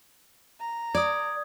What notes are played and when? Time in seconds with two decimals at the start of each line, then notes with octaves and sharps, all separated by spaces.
0.61 A#5
0.95 D5 D#6 G#6